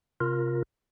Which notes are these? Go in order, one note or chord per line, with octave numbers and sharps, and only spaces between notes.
C3 F4 A#4